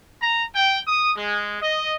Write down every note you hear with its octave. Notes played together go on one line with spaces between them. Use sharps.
A#5
G5
D#6
G#3
D#5